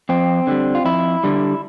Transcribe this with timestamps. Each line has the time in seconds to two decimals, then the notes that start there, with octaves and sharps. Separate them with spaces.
0.09 F2 C4
0.47 D3 G3
0.75 F4
0.85 F2 E4
1.24 D3 G3